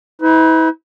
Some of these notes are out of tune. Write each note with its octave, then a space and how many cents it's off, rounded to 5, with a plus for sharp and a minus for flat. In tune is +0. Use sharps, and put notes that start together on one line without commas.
E4 -40 B4 +40